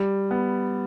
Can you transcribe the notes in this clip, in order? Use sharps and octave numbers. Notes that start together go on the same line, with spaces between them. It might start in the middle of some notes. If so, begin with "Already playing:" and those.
Already playing: G3
B3